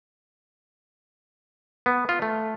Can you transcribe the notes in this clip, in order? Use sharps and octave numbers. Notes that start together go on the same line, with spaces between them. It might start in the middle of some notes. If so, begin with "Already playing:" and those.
B3
F4
A3